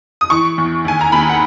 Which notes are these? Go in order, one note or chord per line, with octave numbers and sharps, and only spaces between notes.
D#6
E3 C#6
E2
D#2 G#5
A#5
D#2 B5
F#5